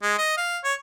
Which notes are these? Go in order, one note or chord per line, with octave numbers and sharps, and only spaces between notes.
G#3
D#5
F5
C#5